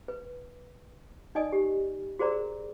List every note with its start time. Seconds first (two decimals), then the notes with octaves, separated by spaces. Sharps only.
0.08 B4
1.35 D#4 D5 D#5 G#5 D#6
1.52 G4
2.19 F#4 G#4 A#4 C5 D5 A#5